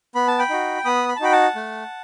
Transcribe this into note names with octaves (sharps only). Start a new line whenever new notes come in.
B3 B5
A5
G5 B5
D#4 F#4
B3 B5 D#6
B5
A5
D#4 F#4 G5 B5
F#5 A5
A3